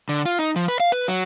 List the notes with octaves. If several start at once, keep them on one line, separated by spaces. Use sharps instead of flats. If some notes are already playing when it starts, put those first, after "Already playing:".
D3
F4
D#4
F3
B4
F5
B4
F#3